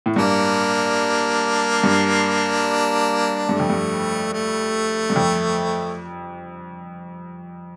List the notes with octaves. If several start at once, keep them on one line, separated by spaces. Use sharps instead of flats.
A2
G2 A#3 D4
G2
G2 A3
F2
G2
A3
G2
F2